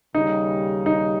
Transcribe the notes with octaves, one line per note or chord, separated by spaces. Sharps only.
D#2 C#3 G3 D#4
D#4